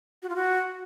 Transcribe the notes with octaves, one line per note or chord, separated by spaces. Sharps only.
F#4
F4
F#4